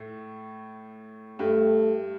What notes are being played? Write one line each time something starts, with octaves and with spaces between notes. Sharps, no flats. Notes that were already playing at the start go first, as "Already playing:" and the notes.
Already playing: A2 A3
G2 G3 A3